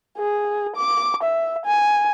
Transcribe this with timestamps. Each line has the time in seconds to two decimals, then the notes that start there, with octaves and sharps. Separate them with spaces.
0.18 G#4
0.76 D6
1.22 E5
1.65 G#5